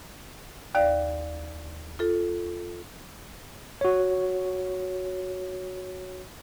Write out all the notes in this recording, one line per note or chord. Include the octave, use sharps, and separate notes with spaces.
D#2 D5 F5
F4 A4
F#4 C#5